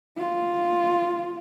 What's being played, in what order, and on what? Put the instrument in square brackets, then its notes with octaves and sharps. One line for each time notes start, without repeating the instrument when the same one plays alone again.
[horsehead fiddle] F4